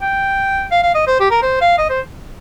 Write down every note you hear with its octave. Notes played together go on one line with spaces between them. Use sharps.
G5
F5
F5
D#5
C5
G4
A#4
C5
F5
D#5
C5